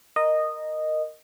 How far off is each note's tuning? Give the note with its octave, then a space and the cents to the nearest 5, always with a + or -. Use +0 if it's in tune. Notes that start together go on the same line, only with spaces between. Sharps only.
A#4 +0 D#5 -10